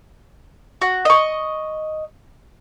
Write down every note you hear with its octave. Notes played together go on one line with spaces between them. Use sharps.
F#4
D#5 C#6